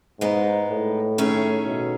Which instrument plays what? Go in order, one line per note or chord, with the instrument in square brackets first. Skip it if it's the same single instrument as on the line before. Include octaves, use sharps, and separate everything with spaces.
[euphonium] G#2 [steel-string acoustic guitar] G#3 B3 D#4
[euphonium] A2
[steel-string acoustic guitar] D#3 A3 C#4 G#4
[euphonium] B2